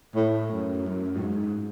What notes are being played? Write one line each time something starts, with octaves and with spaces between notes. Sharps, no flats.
A2
F#2
F#2
A2
G#2